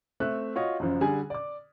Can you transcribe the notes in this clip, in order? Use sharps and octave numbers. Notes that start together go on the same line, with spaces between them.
A3 C4 E5 F#6
F4 F#4 C#5 D#5
F#1 F#2 F3
D3 G3 G#4 G#5
D5 D6